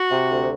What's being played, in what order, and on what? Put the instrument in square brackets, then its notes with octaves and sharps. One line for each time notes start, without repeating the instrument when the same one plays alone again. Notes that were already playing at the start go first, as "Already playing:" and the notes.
Already playing: [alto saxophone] F#4
[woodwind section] C3
D2